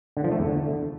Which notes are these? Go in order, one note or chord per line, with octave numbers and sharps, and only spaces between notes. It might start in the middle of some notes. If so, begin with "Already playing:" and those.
D3
F3
A3
E2
D3